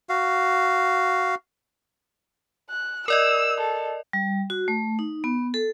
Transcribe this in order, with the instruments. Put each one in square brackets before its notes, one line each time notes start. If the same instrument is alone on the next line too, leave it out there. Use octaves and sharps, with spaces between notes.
[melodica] F#4 F5
[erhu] F#6
[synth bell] A#4 D5 D#5 [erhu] E6
[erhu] A4
[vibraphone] G3
F#4
A3
D#4
B3
A4